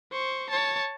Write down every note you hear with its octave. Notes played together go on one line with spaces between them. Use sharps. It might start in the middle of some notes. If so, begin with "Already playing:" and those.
C5 C#6
C#5 A5